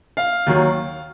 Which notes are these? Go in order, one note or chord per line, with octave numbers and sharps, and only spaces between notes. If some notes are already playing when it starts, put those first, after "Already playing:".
F5
D#2 D#3 F#3